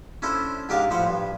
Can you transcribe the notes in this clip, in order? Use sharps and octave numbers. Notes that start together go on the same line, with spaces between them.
C#4 D4 E4 A4 C5
G#2 D4 G4 A#4 F5 A5
A2 F3 C5 F#5
G2